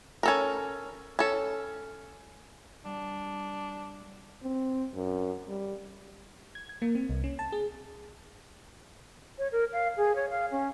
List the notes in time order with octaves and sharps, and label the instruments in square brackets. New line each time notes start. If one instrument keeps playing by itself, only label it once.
[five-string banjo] C#4 A4 A#4
C#4 A4
[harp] G3 [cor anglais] D4
[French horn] C4
F#2
G3
[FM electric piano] G#6
G#6
A#3
C4
C2
C#4
A5
G#4
[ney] C#5
A#4
F5
G#4
C#5
F5
C#4